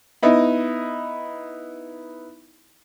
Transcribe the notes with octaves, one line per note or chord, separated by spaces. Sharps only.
B3 D#4 E4